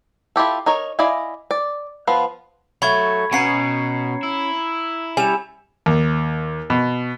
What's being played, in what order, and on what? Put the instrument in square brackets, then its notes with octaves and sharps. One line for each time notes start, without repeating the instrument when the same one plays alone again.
[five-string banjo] E4 F4 G4 A4
D#4 A#4 C#5
E4 D5 D#5 F5 G#5
D5
F3 B3 B4 F5
[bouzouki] F#3 A3 [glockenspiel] B5 C#6 G#6
[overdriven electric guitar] B2 [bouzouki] C#4 F#5 [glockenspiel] A#5 C7 C#7
[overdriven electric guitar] E4
[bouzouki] G3 C#4 [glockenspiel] G#5 E7
[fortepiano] D#2
B2